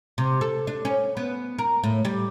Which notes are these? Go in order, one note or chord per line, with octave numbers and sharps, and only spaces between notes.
C3
A4
D4
C#4
B3
A#4
A2
G3